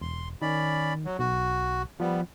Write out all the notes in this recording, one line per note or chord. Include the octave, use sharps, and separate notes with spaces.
E1 C6
D#3 C#4 D5 B5
F#3
B1 F#4
F3 G3 B3